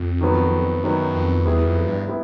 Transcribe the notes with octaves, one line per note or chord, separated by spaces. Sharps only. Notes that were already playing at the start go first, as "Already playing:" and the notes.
Already playing: F2
D#3 F#3 B3
F#2 D#3 F#3 B3
F2
E2 G3 B3 E4 G#4
F2
G2
G3 B3 E4